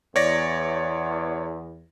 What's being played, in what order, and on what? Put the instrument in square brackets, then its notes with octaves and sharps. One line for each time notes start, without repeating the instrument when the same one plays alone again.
[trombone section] E2 [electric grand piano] C#5 D5 A#6